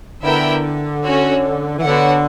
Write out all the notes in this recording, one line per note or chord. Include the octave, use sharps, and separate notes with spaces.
D3 B3 E4 A#4 E5 G5
C#4 F#4 C#5
E3
D3 B3 D4 F#4 C#5 F#5